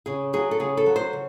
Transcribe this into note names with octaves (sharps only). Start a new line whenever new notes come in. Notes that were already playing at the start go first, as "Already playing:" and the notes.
C#3 G#4
F#3 G#4
A4
C#3 G#4
A4
F#3
C5
C#3